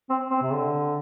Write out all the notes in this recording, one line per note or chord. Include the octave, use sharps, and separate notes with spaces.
C4
C4
C3
D3